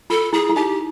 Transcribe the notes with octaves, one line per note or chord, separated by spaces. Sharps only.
F4 A4
E4 G#4
E4
D#4 G4